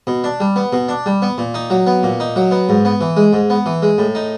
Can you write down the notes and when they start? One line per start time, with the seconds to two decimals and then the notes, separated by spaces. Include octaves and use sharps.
0.07 B2
0.24 D4
0.40 G3
0.56 B3
0.73 B2
0.89 D4
1.06 G3
1.22 B3
1.38 A#2
1.54 D#4
1.70 F#3
1.87 B3
2.03 A#2
2.20 D#4
2.36 F#3
2.51 B3
2.69 G#2
2.85 B3
3.01 E3
3.17 G#3
3.33 G#2
3.50 B3
3.66 E3
3.82 G#3
3.98 A2
4.15 D#4